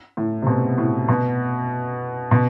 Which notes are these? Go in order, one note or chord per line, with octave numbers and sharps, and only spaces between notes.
A2
C3
B2
A2
B2
B2